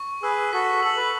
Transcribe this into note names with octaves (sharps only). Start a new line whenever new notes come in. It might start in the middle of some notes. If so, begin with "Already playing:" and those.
Already playing: C#6
G#4 B4 E6
F#4 A4 B6
A4 F#7
B4